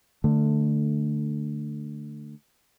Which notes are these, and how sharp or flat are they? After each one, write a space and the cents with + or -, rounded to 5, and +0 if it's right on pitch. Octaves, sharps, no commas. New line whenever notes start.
D3 +10 A3 +0